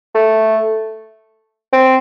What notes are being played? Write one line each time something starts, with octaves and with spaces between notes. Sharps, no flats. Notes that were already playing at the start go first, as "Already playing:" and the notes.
A3
C4